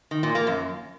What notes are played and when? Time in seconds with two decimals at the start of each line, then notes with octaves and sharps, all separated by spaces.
0.11 D#3
0.23 A#2
0.35 A#3
0.47 F#2